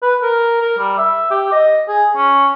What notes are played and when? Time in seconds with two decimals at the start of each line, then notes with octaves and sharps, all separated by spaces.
0.02 B4
0.22 A#4
0.61 A#4
0.78 G3
0.98 E5
1.31 G4
1.52 D#5
1.88 G#4
2.16 C#4